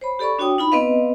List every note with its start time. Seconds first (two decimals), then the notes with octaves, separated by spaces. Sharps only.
0.01 C5 C#5 B5
0.19 G4 A4 D5 B5 C#6
0.39 D4 F#4 C#5 G5 D#6
0.58 D#4 F4 B5
0.72 B3 C4 B4 D#5 F5